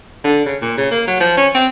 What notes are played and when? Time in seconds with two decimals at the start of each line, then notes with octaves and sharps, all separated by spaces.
0.24 D3
0.46 C#3
0.62 A#2
0.77 C#3
0.91 A#3
1.07 F#3
1.20 F3
1.37 C#4
1.55 C4